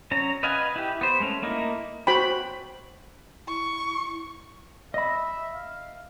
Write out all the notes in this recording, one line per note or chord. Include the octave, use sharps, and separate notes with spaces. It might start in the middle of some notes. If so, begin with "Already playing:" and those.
F#3 C#4 A#5
B4 D#5 F5 F#5 G#5
E4 G4
B3 C5
G#3 A3 C#4
A3 A#3 D#4 E4
F#4 C5 G5 B5
E4 C#6
D#5 E5 B5
F5